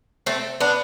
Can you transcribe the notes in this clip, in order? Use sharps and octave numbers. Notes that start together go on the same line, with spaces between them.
A3 C4
B3 D4